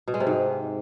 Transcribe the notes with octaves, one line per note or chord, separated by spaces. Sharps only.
B2
G#3
C3
G#2